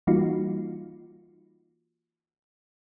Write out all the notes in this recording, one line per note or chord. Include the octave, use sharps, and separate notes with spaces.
E3 G3 A#3 D#4 F4 F#4